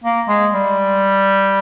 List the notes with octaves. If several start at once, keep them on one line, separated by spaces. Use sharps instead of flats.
A#3
G#3
G3